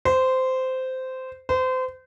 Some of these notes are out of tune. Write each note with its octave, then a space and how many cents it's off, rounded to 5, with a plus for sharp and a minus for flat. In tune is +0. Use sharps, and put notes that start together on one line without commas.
C5 -15
C5 -30